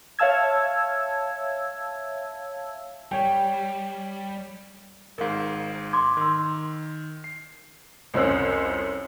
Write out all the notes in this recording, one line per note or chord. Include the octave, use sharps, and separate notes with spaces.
C#5 E5 F5 A5 E6 G#6
G3 C#5 G5
G#1 G#2 A#4 F5
C6 D6 G#6
D#3 C6 E6
C7
C2 F2 C#4 C5 E6 F#6